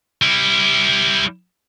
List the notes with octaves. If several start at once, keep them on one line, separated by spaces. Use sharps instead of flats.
G3 E4